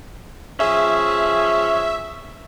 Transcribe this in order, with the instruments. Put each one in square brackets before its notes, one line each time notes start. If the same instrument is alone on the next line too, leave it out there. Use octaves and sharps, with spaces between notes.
[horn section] F3 C#4 G#4 [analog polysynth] E5